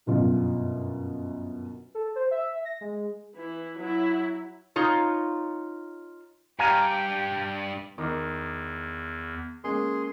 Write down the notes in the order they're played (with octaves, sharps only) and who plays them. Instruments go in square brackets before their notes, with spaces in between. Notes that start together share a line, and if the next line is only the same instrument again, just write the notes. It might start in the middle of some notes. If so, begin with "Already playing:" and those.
[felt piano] G1 F#2 B2 F4
[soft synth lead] A4
C5
E5
A#6
G#3
[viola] E3 E4
F#3 E4
[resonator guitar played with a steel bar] D#4 F4 C#5
[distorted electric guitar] G2 [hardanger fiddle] G4 [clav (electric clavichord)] F5 G#5 A#5
[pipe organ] E2 [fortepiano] D#3 [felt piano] D6
[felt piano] G#3 A#3 C#4 [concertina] G#4 C6